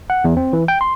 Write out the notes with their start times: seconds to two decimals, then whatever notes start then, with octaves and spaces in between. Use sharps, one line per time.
0.10 F#5
0.24 E2
0.37 C4
0.53 E3
0.68 G5
0.81 C6